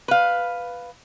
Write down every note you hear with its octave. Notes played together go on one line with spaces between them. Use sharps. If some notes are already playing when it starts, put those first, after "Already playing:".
B4 F5